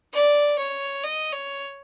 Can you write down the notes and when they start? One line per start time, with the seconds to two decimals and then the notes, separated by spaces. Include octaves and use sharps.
0.14 D5
0.59 C#5
1.04 D#5
1.33 C#5